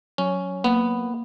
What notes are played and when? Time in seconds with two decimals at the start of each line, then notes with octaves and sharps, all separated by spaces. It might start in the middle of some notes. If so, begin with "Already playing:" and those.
0.18 F#3 C#4
0.64 A#3 B3